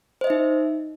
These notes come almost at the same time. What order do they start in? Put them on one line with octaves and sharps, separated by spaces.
C5 D#5 E5 D#4